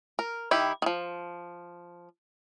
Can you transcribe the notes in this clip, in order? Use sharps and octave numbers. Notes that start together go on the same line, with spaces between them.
A#4
D#3 E4 G4
D#3 F3